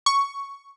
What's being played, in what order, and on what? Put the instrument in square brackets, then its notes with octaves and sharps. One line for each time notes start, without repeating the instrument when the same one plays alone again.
[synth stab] C#6